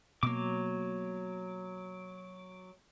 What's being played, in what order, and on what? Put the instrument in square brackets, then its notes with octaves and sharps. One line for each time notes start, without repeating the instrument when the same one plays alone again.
[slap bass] B2 A#3 [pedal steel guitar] F#3 D6